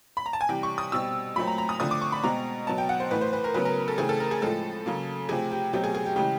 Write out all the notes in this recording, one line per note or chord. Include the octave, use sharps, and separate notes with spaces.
B5
A#5
A5
G#5
C3 E3 G3 G5
C#6
D#6
B2 G3 C4 E6
A#2 F#3 A3 C4 B5
A#5
A#5
D#6
D3 F3 A3 C4 D#6
D6
C#6
B5
B2 G#3 C4 A#5
B2 F#3 B3 A5
G5
F#5
C5
A2 E3 A3 B4
C5
B4
A#4
C#3 F#3 B3 B4
A#4
A4
C#3 E3 A3 C4 G#4
A4
A#4
G#4
A2 F3 G#3 C4 A4
C#3 F#3 A#3
C3 F3 A3 C4 G#4
G4
B2 F#3 A3 C4 G4
G#4
G#4
G4
C#3 E3 G#3 G4